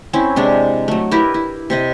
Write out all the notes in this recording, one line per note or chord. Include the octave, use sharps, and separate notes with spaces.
C4 C#4 E4
C3 G#3 D4
F#3 A3
E4 G4 A#4 B4
E4
C3 C4 D#5